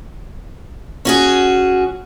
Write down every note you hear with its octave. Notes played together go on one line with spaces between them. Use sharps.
C#4 F#4 G#4